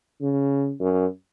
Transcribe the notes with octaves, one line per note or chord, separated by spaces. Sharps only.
C#3
F#2